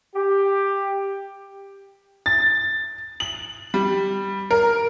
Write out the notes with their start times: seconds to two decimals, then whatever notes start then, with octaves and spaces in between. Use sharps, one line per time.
0.15 G4
2.26 A6
3.20 F#7
3.74 G3
4.51 A#4